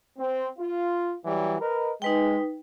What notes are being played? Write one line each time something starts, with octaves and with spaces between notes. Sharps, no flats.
C4
F4
E3 F#3 G3
A#4 B4 D#5
G#3 D#4 B4 G5